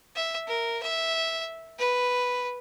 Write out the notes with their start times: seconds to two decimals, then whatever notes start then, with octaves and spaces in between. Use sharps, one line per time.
0.16 E5
0.48 A#4
0.83 E5
1.79 B4